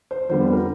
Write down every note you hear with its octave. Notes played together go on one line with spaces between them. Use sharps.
C5
F2 D3 G3 B3 C5
B4
A#4